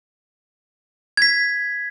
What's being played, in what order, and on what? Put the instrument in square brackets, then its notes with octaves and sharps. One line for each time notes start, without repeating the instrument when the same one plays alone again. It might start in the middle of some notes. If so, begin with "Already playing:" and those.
[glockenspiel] G#6 B6